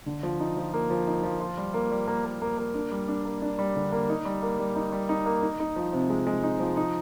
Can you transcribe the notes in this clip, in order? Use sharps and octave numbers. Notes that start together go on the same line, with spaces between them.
D3
F3
D#4
F3
A#3
F3
D#4
F3
F4
G3
A#3
G3
A#3
A#3
A#3
A#3
D4
G3
D4
A#3
D4
G3
D3
A#3
D#4
G3
A#3
G3
D#4
G3
D#4
A#3
D#4
D#4
F3
C3
G#3
G#3
D#4
F3
D#4